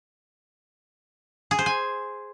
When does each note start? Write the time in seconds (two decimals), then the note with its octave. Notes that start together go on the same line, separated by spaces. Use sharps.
1.51 G#4
1.59 C5
1.66 G#5